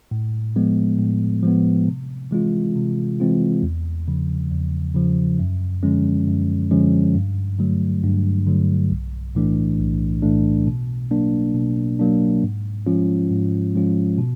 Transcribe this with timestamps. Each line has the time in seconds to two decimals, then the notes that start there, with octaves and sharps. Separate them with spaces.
0.11 A2
0.56 F3 G#3 B3
0.99 A2
1.43 F3 G#3 B3
1.87 C3
2.31 E3 G#3 C4 F4
2.76 C3
3.20 E3 G#3 C4 F4
3.63 E2
4.08 C#3 F3
4.51 E2
4.95 C#3 F3
5.39 F#2
5.83 D3 F3 G#3 C#4
6.27 F#2
6.71 D3 F3 G#3 C#4
7.15 G2
7.59 D3 F#3 A3
8.03 G2
8.46 D3 F#3 A3
8.91 B1
9.35 A2 E3 A3 D4
9.80 B1
10.22 A2 E3 A3 D4
10.67 B2
11.11 F#3 A#3 D4
11.54 B2
11.99 F#3 A#3 D4
12.43 G#2
12.87 F3 G#3 C#4 F4
13.31 G#2
13.75 F3 G#3 C#4 F4
14.18 B2